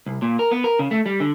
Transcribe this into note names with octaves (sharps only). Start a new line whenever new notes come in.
C2
A#2
A#4
B3
A#4
C#3
A3
G3
D3